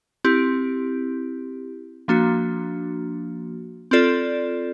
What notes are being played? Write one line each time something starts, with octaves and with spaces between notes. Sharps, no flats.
C4 E4 G4
F3 A#3 D4 F#4
C4 F4 A4 D5